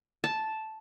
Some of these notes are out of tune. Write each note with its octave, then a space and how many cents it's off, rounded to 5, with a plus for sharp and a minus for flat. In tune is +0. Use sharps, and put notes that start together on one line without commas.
A5 -5